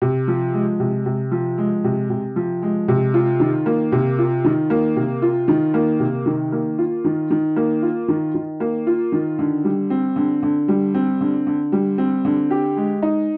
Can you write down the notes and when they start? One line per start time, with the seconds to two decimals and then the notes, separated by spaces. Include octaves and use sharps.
0.02 C3
0.28 F3
0.54 G#3
0.80 C3
1.06 C3
1.32 F3
1.58 G#3
1.84 C3
2.10 C3
2.36 F3
2.62 G#3
2.88 C3
3.14 F4
3.40 D#3
3.66 A#3
3.92 C3
4.19 F4
4.45 D#3
4.70 A#3
4.96 C3
5.22 F4
5.48 D#3
5.74 A#3
6.00 C3
6.26 D#3
6.52 A#3
6.78 F4
7.04 D#3
7.31 D#3
7.56 A#3
7.82 F4
8.08 D#3
8.35 D#3
8.60 A#3
8.87 F4
9.12 D#3
9.39 D3
9.64 G3
9.90 C4
10.16 D3
10.43 D3
10.68 G3
10.95 C4
11.21 D3
11.47 D3
11.72 G3
11.98 C4
12.25 D3
12.51 G4
12.77 G#3
13.02 D#4